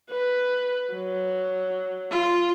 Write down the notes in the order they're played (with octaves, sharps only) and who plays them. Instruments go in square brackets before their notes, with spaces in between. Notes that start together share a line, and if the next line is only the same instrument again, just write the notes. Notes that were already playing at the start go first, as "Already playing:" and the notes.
[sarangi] B4
F#3
[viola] F4